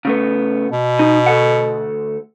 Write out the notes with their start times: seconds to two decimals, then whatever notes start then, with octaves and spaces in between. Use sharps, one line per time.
0.05 C#3 A3 B3
0.72 B2
0.99 D#4
1.26 D2 A4 F#5